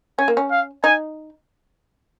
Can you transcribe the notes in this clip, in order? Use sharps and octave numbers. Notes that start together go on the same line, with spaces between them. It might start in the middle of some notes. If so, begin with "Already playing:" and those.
C#4 G#5
A#3
C#4
F5
D#4 G#5